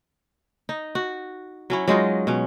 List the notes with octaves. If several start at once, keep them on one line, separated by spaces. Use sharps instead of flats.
D#4
F#4
F#3 C#4 E4
F#3 G#3 D#4 F4
B2 C#4